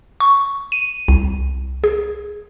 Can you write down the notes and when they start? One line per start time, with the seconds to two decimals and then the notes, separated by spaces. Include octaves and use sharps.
0.20 C#6
0.72 D#7
1.08 C2
1.84 G#4